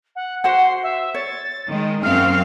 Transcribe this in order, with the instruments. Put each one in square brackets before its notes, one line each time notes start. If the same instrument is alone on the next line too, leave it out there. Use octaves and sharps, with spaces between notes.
[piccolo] F#5
[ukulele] F#4 C5 F#5 [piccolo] C6
[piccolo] E5
[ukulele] C#5 [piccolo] A6
[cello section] D#3 G#3
[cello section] F#2 C4 F5 [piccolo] F6